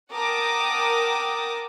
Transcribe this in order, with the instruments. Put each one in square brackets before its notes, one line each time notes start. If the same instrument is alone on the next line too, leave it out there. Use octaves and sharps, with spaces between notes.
[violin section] A#4 F#5 G5 A5 D6 D#6